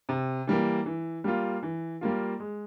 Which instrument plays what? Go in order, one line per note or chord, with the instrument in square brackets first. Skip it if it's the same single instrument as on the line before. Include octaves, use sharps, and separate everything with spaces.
[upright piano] C3
E3 G3 A#3
E3
G3 A#3 F4
E3
G3 A#3 F4
G#3